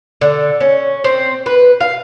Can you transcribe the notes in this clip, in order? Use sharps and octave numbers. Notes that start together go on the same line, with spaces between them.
D3
C#4
C4
B4
F5